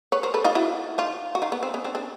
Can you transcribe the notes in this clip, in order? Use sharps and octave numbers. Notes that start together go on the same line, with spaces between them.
B4 C#5
A#4 C5
A4 B4
D#4 F4
E4 F#4
D#4 F4
F#4
D#4 F4
B3
C4
B3 C#4
C4 D4
C4 D4